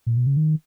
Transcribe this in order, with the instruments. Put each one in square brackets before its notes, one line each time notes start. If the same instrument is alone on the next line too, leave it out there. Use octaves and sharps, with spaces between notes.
[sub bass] A#2
B2
C#3
D#3